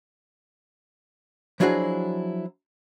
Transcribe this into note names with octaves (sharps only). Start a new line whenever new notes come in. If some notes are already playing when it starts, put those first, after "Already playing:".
F3 F#3 D4 E4 F#4 G#4